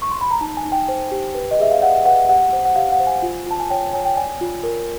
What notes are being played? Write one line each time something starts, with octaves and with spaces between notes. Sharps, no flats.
C#6
C6
B5
A#5
D#4 A5
G#5
D#4
G5
C5
G4
B4
D#5
G#4 E5
F5
D5 F#5
B4 F#5
G4 F#5
C5
F#5
G4 F5
F#5
C5
G#5
F4
F4 A5
G#5
C#5 G5
C#5 G#5
G5
D5 G#5
F4
A#4